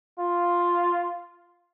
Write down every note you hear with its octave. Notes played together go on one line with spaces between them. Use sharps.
F4